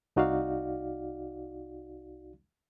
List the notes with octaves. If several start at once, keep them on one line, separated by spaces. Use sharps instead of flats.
C2 D#4 F#4 D5 F5